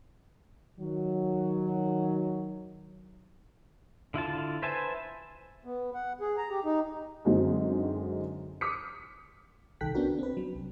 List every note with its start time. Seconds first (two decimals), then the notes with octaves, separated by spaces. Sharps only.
0.80 D#3 F#3
4.14 D3 E4 F4 A5
4.62 B4 C5 E5 G#5 A5
5.65 B3
5.94 F#5
6.21 G#4
6.37 A#5
6.50 G4
6.65 D#4
7.25 F#2 D3 F#3 G#3 C4 D#4
8.61 D6 D#6 F6 B6 C#7
9.81 C2 D#3 A4 G5 F#6 B6
9.95 B3 C#4 D4 F#4 A#4
10.19 C4 B4
10.37 F#3
10.55 C2